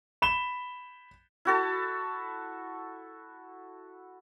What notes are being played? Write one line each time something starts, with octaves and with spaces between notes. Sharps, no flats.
B5 E7 G7
E4 F#4 A4 A5